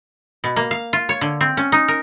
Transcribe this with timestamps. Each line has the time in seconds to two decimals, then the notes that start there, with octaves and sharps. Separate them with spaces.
0.44 B2
0.56 A#3
0.71 F5
0.93 F4
1.09 C#5
1.21 D3
1.41 C4
1.57 C#4
1.72 D#4
1.88 A#4